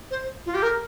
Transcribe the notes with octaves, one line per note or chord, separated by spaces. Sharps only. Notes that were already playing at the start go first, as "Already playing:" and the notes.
C5
F4
G4
A#4